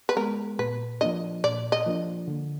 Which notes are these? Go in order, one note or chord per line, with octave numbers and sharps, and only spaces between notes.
B4
G#3 B3 A#4
A#2 B4
F3 A#3 D4 D#5
A#2 D5
D#5
F3 A#3 D4
D3